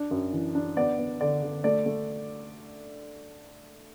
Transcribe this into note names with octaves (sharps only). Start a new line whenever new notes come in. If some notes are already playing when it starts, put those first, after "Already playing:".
Already playing: D4
F#2
E3
D4
B3 D5
B3
D3 D5
D3
A3 D5
A3